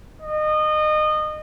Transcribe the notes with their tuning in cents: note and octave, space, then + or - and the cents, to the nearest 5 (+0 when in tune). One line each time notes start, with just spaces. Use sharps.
D#5 -25